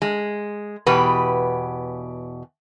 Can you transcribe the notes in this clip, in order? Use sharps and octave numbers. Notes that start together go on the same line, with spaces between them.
G#3
E2 B2 G4 B4